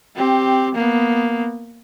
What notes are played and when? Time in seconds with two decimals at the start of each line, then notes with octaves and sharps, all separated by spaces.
0.16 C4 G4
0.75 A#3 B3